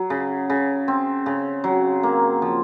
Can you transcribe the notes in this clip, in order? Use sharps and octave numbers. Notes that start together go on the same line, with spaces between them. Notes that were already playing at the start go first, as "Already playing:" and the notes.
Already playing: F#3
C#3
C#3
C4
C#3
F#3
A#3
F3